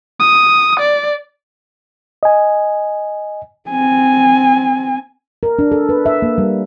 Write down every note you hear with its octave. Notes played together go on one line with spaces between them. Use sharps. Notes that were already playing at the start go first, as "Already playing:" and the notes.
D#6
D5
D#5 G#5
C4 G#5
A#4
D4
A4
B4
E5
A#3
G3